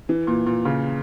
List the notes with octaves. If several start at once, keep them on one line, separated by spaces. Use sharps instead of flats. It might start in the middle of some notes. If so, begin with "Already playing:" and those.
E3
A#2
A#2
C#3